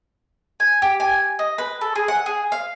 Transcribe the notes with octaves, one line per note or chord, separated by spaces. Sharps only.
G#5
G4
G#5
D#5
B4
A4
G#4
F#5
G#4
F5